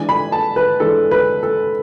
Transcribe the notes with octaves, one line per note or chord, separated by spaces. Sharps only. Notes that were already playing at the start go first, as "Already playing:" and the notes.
Already playing: E3 G#3 D4 G#5
B5
A5
B4
E3 G#3 D4 A4
B4
A4